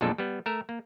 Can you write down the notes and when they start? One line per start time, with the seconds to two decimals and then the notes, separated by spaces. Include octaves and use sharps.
0.01 B1 F2 A#2 G#3 D4 A4
0.18 G3 B3
0.46 A3 A#4 E5
0.69 A#3